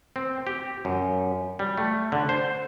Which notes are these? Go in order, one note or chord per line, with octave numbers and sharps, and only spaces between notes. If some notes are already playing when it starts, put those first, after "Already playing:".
C4
G4
F#2
G3
A3
D3
C5